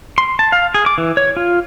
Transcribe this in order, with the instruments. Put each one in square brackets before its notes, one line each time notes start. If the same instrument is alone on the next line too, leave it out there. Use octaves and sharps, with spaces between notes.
[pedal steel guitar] C6
A5
F5
G#4
D6
E3
C#5
F4